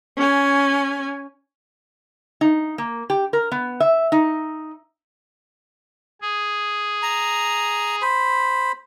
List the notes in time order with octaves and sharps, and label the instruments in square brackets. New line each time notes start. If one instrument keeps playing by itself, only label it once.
[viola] C#4 G#5
[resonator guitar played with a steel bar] D#4
A#3
G4
A#4
B3
E5
D#4
[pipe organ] G#4
[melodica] A#5
C5 B5